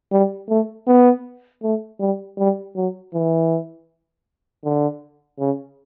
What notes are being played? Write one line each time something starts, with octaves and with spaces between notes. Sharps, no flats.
G3
A3
B3
A3
G3
G3
F#3
E3
D3
C#3